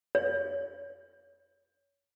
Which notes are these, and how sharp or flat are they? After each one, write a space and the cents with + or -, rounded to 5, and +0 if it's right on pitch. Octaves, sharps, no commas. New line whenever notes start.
C#5 +20